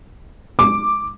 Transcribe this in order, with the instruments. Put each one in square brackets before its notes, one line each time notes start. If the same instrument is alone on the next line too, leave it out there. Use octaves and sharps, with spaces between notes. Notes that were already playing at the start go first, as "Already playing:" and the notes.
[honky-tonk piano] D6